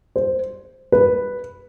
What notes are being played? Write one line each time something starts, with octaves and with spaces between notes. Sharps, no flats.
C5
B4